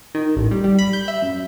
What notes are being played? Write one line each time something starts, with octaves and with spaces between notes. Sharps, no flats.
D#3
A1
G3
G3
B5
G6
E5
F#2